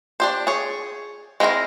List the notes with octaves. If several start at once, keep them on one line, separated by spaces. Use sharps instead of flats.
D4 G4 C5
G#4 C#5
G#3 C4 E4 A4 A#4